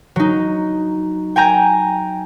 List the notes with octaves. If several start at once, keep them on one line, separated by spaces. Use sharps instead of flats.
F#3 D#4
G5 G#5 A#5 G6